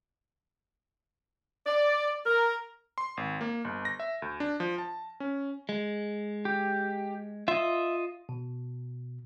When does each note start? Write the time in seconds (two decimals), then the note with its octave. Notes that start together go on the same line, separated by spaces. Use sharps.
1.66 D5
2.26 A#4
2.98 C6
3.17 G#1
3.41 A#3
3.65 G1
3.85 A#6
4.00 E5
4.22 D2
4.40 D4
4.60 F3
4.78 A5
5.20 C#4
5.69 G#3
6.45 G4
7.48 F4 D#5 E5
8.29 B2